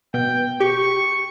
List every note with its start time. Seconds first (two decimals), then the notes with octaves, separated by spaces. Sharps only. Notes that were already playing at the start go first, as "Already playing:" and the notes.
0.14 B2 G5
0.60 G4 C#6